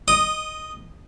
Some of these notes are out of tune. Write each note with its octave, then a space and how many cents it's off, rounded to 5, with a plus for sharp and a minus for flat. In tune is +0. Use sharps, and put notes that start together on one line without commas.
D#5 +0 D#6 -15